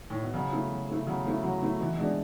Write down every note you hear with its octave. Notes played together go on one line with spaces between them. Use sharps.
A2
B2
C#3 F#3
A3 E4
F#3
A3 E4
C#3 F#3
A3 E4
F#3
A3 E4
B2 E3
B2 G#3 D4